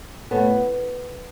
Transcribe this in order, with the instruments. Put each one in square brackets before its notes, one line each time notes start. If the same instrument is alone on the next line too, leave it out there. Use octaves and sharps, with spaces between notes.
[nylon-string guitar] A2 G3 B3